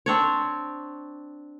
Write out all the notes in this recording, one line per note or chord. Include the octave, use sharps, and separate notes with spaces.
C4 D4 C#5